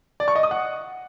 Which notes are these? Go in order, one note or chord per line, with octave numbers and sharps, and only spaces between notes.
D5
C#6
D#5
D#6
F#5